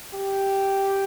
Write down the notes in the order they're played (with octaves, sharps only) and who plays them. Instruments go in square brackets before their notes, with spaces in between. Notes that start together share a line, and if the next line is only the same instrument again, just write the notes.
[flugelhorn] G4